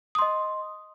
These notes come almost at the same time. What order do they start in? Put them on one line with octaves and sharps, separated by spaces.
D#6 C6 D#5